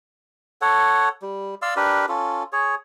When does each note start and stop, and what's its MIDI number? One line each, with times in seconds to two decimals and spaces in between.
0.62 1.09 69
0.62 1.09 73
0.62 1.09 78
1.22 1.55 55
1.62 1.74 74
1.62 1.74 77
1.62 1.74 84
1.62 1.74 88
1.77 2.06 62
1.77 2.06 67
1.77 2.06 70
1.77 2.06 71
2.09 2.43 61
2.09 2.43 65
2.09 2.43 69
2.53 2.75 68
2.53 2.75 73